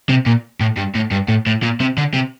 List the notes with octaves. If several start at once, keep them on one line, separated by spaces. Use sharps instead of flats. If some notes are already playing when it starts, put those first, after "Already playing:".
C3
A#2
A2
G2
A2
G2
A2
A2
A#2
C3
D3
C3